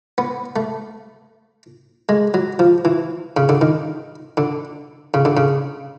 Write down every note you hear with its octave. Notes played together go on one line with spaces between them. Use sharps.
B3
A3
G#3
F#3
F3
E3
C#3
D3
D#3
D3
C#3
D3
C#3